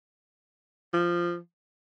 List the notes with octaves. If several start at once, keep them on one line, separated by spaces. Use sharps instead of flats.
F3